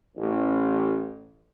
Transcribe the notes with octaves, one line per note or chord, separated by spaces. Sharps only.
A1